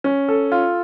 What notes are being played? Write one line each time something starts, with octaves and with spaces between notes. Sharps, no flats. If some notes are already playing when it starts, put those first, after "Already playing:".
C#4
A4
F4